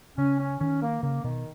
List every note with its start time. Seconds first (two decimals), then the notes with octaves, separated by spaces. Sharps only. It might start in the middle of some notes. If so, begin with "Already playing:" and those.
0.17 C#3 C#4
0.39 C#4
0.60 D#3 C#4
0.81 A#3
1.03 C#3 A#3
1.24 B2 D#3